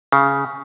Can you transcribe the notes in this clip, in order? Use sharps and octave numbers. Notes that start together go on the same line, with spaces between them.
C#3